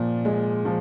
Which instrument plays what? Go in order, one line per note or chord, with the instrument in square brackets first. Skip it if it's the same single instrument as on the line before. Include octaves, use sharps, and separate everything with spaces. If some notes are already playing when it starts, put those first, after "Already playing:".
Already playing: [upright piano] A#2 F3
G#3
F3